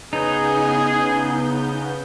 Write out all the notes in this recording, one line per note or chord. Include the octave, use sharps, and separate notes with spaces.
C#3 B3 D#4 G#4 G6